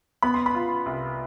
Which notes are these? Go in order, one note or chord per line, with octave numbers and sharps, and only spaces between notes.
B3 B5
C6
B5
F4
C2